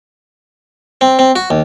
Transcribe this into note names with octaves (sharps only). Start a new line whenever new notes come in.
C4
C4
F#4
D#2